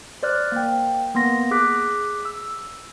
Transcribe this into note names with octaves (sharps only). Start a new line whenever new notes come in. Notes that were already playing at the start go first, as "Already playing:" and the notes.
C5 D5 F6 F#6
A#3 G5
A#3 B3 C6 A#6
G#4 D6 F#6 B6
E6